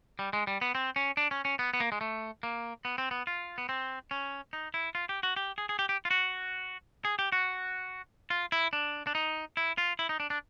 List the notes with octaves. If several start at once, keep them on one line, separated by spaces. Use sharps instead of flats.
G3
G#3
G3
B3
C4
C#4
D4
C#4
C#4
B3
B3
A#3
G#3
A3
A#3
B3
C4
B3
F4
B3
C4
C#4
D#4
E4
F4
G4
F#4
G4
G#4
G#4
G4
G4
F4
F#4
G#4
G4
F#4
F4
E4
D4
D4
D#4
E4
F4
E4
D#4
D4
D4